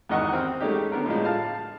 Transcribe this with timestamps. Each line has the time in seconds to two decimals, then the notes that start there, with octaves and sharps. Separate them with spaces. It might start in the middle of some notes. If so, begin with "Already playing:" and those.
0.09 E2 G#2 D#3 D#5 F#5 C#6
0.33 C4 F6
0.61 G#3 A3 C#4 D#4 G4
0.92 D3 B3 A#4
1.06 A2 F3 G#3
1.25 F5 A5